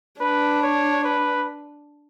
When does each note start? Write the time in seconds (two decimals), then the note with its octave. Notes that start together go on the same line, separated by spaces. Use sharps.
0.21 D4 B4
0.63 C#5
1.04 B4